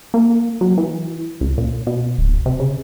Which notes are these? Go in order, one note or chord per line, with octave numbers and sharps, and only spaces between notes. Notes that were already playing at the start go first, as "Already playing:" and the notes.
A#3
F#3
E3
C#2
A#2
B2
D1
C3
C#3